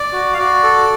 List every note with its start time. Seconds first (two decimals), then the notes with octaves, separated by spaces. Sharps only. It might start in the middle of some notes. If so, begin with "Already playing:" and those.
Already playing: D5
0.12 F#4
0.33 F5
0.38 F#4 D5
0.63 A4